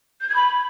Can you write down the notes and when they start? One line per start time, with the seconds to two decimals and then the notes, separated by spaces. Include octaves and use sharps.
0.21 G6
0.28 G#6
0.36 B5